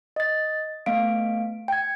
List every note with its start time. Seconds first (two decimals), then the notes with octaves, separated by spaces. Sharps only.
0.16 D#5 A6
0.86 A3 B3 F5 D7
1.68 G5 G#6